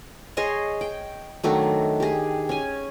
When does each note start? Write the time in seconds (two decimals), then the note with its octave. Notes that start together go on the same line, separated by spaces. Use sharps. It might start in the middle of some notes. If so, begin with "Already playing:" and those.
0.37 G#4 C#5 D#5 C6
0.81 G5
1.43 D#3 F#3 A3 D4
2.00 G4 G#4
2.49 C#4 G#5